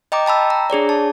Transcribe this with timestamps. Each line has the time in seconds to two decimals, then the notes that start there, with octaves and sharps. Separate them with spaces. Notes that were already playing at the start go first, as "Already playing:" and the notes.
0.12 D#5 G5 A#5 D6
0.26 G5 A5 B5 E6
0.50 A#5
0.70 D4 G#4 C#5 D5
0.89 A5